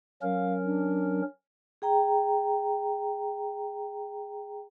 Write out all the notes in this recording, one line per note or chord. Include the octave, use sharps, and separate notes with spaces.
F#3 C#4 A#4 F5
D4
G#4 G5 A#5